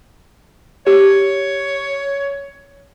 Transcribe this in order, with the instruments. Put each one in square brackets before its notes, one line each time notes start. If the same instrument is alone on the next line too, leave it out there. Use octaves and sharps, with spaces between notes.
[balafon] G4 [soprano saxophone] C#5